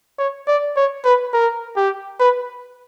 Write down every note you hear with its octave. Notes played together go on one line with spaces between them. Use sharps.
C#5
D5
C#5
B4
A#4
G4
B4